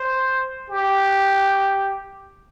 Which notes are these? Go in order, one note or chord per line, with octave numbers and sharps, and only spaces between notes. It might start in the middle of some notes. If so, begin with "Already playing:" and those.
Already playing: C5
G4